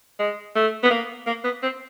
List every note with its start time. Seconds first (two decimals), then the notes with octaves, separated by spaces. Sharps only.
0.19 G#3
0.55 A3
0.83 B3
0.90 A#3
1.27 A#3
1.44 B3
1.63 C4